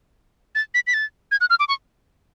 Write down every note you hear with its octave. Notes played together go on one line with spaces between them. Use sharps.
A6
B6
B6
A6
G#6
F#6
F6
D6
C#6